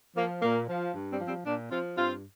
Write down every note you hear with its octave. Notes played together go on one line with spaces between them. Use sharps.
F3 A#3
A#2 A#3
F3
G2
G3 C4
F3
G3 C4
A#2 A#3 D4
F3 C4 F4
G2 C4 F4